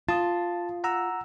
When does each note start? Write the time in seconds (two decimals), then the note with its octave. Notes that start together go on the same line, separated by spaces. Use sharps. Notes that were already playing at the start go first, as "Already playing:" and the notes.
0.09 F4 A5 D#6
0.84 F#5 A#5 E6